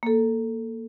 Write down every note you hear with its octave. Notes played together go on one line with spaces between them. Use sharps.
A#3 A4